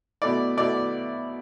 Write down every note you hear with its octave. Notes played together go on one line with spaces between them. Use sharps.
B2 A3 E4 D5
B2 A3 E4 D5